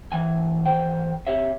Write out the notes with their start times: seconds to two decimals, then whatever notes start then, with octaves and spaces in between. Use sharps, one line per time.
0.12 G#2 E3 G#5
0.65 G#2 E3 C5 G5
1.27 C3 G4 C#5 E5